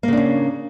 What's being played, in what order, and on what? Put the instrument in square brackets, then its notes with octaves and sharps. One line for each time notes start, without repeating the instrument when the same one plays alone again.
[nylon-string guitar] A#3
C#3
D4
C#4